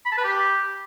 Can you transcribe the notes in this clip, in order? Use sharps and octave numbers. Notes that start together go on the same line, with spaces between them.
B5
A5
B4
G4